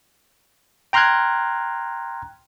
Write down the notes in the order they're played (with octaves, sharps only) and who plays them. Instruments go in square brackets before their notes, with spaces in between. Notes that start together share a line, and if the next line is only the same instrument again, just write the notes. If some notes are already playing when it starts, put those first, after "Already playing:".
[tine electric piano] G5 A#5 C6 F6 F#6 G#6